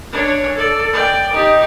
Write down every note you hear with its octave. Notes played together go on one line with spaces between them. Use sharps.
D4 C#5
A4 D5
D5 G5
D#4 G4